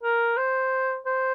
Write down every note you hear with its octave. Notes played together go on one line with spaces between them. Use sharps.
A#4
C5
C5